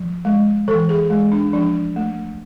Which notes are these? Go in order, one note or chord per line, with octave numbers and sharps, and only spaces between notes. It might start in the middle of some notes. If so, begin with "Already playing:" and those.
Already playing: F3
G#3
E3 A4
G#4
G#3
D4
F3 D4
A3